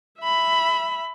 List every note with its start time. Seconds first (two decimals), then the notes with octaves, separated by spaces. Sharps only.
0.19 E5 B5